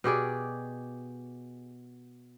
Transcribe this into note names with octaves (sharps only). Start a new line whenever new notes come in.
B2 G4 G#4 D5